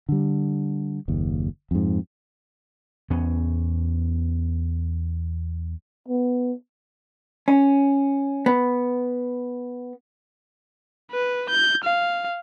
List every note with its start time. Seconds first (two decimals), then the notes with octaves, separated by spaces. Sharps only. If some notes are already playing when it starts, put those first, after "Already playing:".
0.09 D3 G3
1.08 F#1 D#2
1.71 F2 G#2
3.10 E2 B3 C#4
6.08 B3
7.48 C#4
8.46 B3
11.12 B4
11.49 G6
11.84 F5